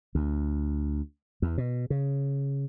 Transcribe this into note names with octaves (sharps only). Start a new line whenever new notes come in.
D2
E2
B2
C#3